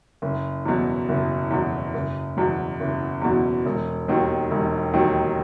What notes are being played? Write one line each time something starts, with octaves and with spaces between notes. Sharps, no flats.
F#1
E2 B2 F#3
F#1
E2 B2 F#3
F#1
E2 B2 F#3
F#1
E2 B2 F#3
E1
D#2 D#3 F#3
E1
D#2 D#3 F#3